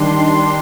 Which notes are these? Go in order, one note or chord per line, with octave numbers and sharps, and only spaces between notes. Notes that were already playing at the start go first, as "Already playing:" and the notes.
Already playing: D#3 G3 D4 C6